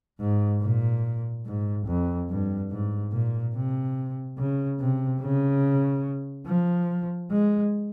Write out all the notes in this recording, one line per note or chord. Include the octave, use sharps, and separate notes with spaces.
G#2
A#2
G#2
F2
G2
G#2
A#2
C3
C#3
C3
C#3
F3
G#3